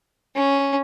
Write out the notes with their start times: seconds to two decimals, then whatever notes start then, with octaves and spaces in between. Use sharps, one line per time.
0.35 C#4